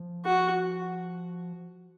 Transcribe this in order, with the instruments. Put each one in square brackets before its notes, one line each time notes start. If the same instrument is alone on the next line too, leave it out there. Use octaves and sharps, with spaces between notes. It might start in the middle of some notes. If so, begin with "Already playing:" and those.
Already playing: [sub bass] F3
[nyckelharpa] F#4